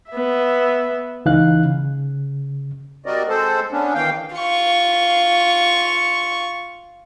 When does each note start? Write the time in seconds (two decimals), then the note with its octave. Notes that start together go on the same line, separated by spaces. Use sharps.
0.11 B3 E5
1.25 C#2 E3 D#4 F5 F#6
1.65 C#3
3.06 G3 C4 F#4 A#4 D5 D#5
3.29 G#3 C4 A4 C5
3.72 B3 C#4 D4
3.94 D#3 E3 F5 G5
4.36 F4 C#6